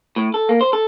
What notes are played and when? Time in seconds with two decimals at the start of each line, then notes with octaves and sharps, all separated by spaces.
0.16 A2
0.34 A4
0.49 A#3
0.61 C5
0.73 A4